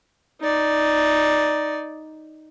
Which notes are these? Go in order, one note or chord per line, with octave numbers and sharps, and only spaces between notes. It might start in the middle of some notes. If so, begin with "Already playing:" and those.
D#4 D5